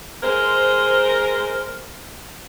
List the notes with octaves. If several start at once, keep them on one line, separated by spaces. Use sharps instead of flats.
G#3 A#4 C5